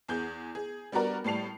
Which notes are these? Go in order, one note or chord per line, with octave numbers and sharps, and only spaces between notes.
E2 G#4 G6
G#4
G3 B3 D4 F#4 A#4 D5
A2 G3 A5 C7 F7